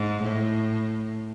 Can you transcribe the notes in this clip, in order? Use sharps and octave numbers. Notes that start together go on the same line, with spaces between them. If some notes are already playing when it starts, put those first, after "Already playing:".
Already playing: G#2
A2